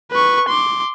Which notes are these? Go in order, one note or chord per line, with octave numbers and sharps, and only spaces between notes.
B4 C#6
C6 D6